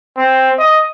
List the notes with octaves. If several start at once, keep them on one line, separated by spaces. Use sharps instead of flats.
C4
D#5